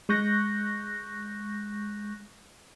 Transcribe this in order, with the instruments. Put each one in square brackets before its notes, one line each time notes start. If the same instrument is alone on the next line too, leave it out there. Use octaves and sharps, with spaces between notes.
[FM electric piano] G#3 C#6 F#6 G6 A#6